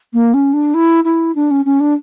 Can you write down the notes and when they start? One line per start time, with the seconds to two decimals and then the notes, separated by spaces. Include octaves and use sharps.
0.13 A#3
0.34 C#4
0.53 D4
0.74 E4
1.04 E4
1.35 D4
1.50 C#4
1.65 C#4
1.80 D4